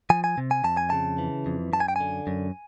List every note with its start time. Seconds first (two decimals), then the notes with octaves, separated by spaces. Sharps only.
0.10 F3 G#5
0.24 G#5
0.38 C3
0.51 G#5
0.64 F2 A5
0.77 G#5
0.90 C#3 A5
1.18 E3
1.46 F2
1.73 F#2 A5
1.80 G#5
1.88 G5
1.96 D3 G#5
2.27 F#2